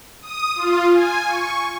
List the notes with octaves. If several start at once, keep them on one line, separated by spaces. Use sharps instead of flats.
D#6
F4
G#5
C#6